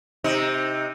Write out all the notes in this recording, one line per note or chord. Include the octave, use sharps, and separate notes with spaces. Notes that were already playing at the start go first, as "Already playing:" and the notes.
C3 D#4